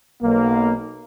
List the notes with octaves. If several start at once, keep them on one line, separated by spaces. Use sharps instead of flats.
B1 A#3